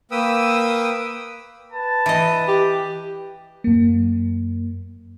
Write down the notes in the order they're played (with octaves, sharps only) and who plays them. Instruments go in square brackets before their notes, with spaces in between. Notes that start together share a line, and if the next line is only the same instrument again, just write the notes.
[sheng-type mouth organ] A#3 B4 G5 D#6 E6
[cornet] B4 [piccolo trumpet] A5
[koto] E3 D#5
[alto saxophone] G4
[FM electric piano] F#2 A#3